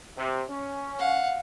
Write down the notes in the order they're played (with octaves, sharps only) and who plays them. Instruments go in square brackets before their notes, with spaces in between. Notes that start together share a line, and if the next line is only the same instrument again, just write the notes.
[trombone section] C3
C#4
[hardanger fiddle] F5 F#5